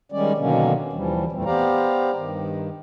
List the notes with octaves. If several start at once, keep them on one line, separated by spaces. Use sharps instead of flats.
D#3 G3 G#3 C#4 D5
B2 D3 D#3 F#3 A#3 C#4
D#2 E3 F3 G3
F2 A#2 E3 G3 A3 C4
B3 G4 C5 D5 F5 A#5
G2 D#3